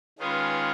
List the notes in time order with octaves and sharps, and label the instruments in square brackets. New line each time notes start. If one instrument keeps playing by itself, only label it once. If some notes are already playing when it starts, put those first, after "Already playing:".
[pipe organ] D#3 G#3 C#4 F4 G#4 [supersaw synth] B4